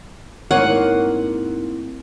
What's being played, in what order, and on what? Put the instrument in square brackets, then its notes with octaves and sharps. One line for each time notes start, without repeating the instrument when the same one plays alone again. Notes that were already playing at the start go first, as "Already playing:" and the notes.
[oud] G#2 A#3 C#5 [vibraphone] A3 C4 E4 [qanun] F#5